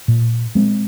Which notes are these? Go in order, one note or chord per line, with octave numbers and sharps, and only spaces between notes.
A#2
G#3 C4